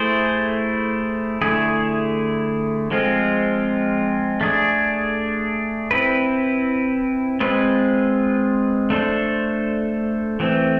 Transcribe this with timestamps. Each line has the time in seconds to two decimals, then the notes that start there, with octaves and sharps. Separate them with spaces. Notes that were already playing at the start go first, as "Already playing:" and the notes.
Already playing: A3 E4 G#4 C5
1.42 D3 A3 E4 G#4
2.91 F3 G#3 C4 F4
4.41 A3 D4 G#4
5.91 C4 E4 B4
7.40 G#3 C4 F4 B4
8.90 A3 D4 A4 C5
10.40 E3 A3 C4